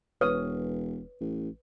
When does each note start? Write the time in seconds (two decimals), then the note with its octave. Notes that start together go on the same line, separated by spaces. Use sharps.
0.21 E1 B4 C#5 D#6
1.21 A1